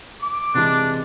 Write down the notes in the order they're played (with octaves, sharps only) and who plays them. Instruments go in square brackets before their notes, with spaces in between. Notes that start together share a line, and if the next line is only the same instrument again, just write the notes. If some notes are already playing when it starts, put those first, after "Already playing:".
[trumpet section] D6
[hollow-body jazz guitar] C3 E3 G#3 [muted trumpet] D4